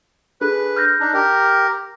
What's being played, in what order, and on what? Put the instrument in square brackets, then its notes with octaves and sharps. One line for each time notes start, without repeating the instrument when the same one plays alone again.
[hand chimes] D4 G#4 A4 [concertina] B4
[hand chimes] F6 G6 A#6
[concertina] D4 D#4
G4 A#4